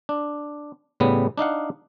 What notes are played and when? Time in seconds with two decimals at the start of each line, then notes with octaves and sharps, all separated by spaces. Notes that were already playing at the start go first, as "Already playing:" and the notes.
0.09 D4
1.00 A2 C#3 G3 B3
1.38 D4 D#4 F5 F#5